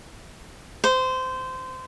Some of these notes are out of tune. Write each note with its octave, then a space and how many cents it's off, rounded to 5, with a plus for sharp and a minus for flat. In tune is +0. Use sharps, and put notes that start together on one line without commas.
C5 -20